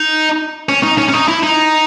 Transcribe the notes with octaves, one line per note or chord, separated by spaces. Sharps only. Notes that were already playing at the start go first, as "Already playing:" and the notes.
Already playing: D#4
C#4
D#4
C#4
C#4
D#4
E4
D#4